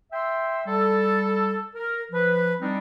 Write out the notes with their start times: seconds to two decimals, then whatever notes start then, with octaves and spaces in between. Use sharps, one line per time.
0.13 E5 G5 C6 E6
0.66 G3 A4
1.75 A#4
2.12 F3 B4
2.60 G3 C4 D4 D#4